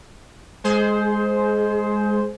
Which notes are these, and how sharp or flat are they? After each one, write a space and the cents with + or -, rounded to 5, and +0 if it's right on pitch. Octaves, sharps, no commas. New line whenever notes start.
G#3 +0 G#4 +30 C5 +0